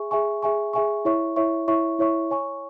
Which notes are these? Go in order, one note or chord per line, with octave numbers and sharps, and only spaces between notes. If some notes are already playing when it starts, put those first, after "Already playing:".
Already playing: G#4 E5 G#5 C#6
G#4 E5 G#5 C#6
G#4 E5 G#5 C#6
G#4 E5 G#5 C#6
E4 C#5 E5 C#6
E4 C#5 E5 C#6
E4 C#5 E5 C#6
E4 C#5 E5 C#6
C#5 G#5 C#6